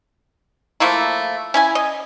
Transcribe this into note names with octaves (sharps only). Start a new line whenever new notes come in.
F3 A3 A#3 E4
C#4 E4 G#5
D#5